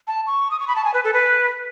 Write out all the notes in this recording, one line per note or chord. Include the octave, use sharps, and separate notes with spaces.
A5
C#6
D#6
C#6
B5
A5
G#5
B4
A4
B4